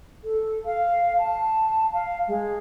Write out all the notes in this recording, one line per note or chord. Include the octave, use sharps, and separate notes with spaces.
A4
F5
A5
F5
G#3